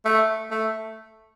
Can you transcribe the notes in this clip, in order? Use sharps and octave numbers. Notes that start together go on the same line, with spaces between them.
A3
A3